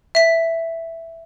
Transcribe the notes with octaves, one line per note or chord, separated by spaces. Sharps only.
E5 B6